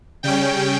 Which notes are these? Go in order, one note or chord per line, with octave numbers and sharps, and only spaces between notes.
C#3 G3 C#4 G5